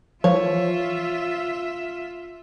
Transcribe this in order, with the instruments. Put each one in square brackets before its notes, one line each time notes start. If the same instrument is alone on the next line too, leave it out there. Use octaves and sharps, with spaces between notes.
[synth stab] E3 F3 [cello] F4 E5 [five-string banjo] C#5